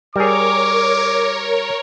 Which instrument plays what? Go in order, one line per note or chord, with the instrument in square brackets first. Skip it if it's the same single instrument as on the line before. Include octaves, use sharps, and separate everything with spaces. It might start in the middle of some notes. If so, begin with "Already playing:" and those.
[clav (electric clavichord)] G3 G#4 [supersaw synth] A#4 C#5 [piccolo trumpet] D6